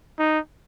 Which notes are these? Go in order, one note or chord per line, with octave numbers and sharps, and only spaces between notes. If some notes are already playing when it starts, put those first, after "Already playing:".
D#4